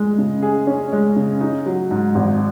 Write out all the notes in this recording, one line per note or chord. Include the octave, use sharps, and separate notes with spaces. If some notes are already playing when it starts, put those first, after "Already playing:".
Already playing: G#3
C#3
G#4
C#4
G#3
C#3
D#4
F#3
G#2
G#1